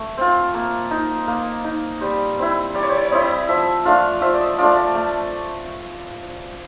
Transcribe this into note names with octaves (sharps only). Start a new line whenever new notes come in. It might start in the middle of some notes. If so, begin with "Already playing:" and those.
Already playing: A3
C4 F4
A#3
D#4
A#3
D#4
G3 C5
C4 E4
G3 D5
C#5
C5
C#5
C4 E4 D#5
F3 E5
A3 D4 F4 F5
F3 E5
D5
D#5
A3 D4 F4 D5
D5
A3